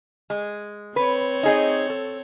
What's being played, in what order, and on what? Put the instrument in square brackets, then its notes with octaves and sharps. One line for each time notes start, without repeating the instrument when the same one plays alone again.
[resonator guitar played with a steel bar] G#3
[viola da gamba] C4 C#5 [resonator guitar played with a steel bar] B4
[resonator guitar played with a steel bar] D#4 G#4 D#5
A4